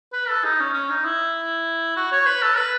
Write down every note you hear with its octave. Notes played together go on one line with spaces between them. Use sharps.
B4
A4
D#4
C#4
C#4
D#4
E4
F#4
C#5
B4
A4
B4